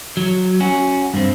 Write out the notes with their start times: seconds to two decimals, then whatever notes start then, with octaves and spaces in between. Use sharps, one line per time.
0.17 F#3
0.60 C#4 F#4
1.14 G2 C4